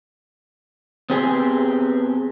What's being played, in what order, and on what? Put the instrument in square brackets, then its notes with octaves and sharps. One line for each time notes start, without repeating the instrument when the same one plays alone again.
[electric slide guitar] B3 C4 G4 G#4